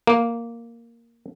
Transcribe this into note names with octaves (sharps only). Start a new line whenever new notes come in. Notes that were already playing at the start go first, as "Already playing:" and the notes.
A#3